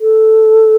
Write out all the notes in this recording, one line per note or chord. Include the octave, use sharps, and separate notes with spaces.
A4